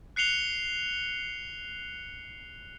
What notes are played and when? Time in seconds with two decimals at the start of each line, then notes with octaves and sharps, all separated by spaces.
0.16 F#6 C7 C#7 F7 G7